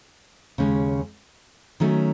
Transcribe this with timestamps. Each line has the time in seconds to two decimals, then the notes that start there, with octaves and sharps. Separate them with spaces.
0.58 D#2 C#3 G#3 C#4
1.80 D#3 F#3 A3 C#4